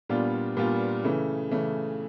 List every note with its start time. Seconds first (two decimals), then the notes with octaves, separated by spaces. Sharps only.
0.09 A#2 G3 B3 D4 F4
0.57 A#2 G3 B3 D4 F4
1.04 C#3 E3 A3
1.51 C#3 E3 A3